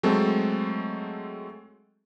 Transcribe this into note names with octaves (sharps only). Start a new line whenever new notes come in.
F#3 G#3 A3 C4 A4